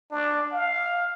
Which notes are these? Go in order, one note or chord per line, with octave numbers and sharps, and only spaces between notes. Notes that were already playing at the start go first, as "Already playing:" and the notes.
D4
F5